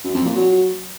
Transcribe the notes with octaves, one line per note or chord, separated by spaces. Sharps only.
F#2
F2
A#2
F#3